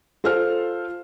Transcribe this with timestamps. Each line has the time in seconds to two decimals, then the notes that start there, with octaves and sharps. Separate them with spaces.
0.24 F4 A4 C5 F5 F6